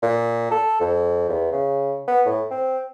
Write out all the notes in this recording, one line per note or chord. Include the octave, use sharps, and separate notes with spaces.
A#2
A4
F2
E2
C#3
B3
A2
C4